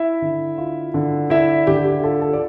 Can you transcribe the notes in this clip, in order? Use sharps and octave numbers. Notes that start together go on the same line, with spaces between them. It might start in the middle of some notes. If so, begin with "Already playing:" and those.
Already playing: E4 E5
D3
F4
D3
D4 E4 E5
D3 G4
G4
F4 A4
A4
D5